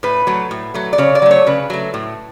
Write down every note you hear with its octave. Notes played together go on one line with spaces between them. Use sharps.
A2 B4
F#3 A3
A2
F#3 A3
D5
C#3 C#5
D5
F#3 A3
C#5
C#3 B4
F#3 A3
A2